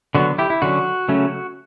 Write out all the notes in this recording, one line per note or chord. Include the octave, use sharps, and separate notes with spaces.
D3 F#3 B3 F#4
E4 G4
E4
D3 F#3 C#4 F#4
C#3 F#3 A3 C#4